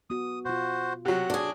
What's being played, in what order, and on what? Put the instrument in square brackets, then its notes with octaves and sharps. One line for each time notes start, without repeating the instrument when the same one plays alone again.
[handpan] B3 F#4 [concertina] D#6
[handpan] B2 F4 [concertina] F#4 C5
[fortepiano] C3 F#3 [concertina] F#5
[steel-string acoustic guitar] D4 G#4